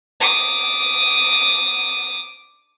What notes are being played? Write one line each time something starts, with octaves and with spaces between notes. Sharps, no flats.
D6 D#6